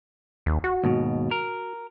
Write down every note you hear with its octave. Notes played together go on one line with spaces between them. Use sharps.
D#2
F#4
D#2 G#2 B2
A#4